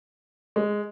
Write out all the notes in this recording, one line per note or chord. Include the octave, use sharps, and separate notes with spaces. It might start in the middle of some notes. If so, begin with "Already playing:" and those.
G#3